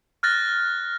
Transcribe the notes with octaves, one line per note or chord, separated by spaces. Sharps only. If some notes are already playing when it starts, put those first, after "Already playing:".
F6 F#6 A6 A#6